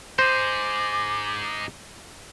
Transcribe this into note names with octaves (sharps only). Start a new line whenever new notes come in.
D#4 G#4 C5 D6